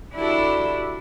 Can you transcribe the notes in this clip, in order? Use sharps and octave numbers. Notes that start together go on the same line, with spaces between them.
D4 E4 F#4 G4 A4